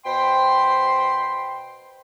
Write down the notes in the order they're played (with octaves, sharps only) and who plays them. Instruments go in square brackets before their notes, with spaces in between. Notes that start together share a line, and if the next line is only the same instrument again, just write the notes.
[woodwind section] B2 C5 G5 B5 C6